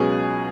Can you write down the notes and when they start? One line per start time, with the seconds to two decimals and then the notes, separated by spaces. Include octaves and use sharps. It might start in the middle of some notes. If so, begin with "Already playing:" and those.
Already playing: C#2 B2 F#3 C#4 G#4